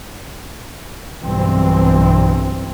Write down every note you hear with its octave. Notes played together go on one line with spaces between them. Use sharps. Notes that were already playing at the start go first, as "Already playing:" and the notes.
B1 G2 E3 C4